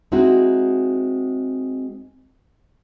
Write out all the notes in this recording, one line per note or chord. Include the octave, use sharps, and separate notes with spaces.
G#3 C4 D#4 E4 F#4